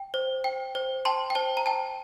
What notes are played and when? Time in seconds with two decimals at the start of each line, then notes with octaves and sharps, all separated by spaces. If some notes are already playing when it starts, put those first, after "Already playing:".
Already playing: G5
0.14 C5
0.44 G5
0.75 C5
1.05 G5 A5 C6
1.30 G5
1.35 C5 A5
1.57 A#5
1.66 G5 A5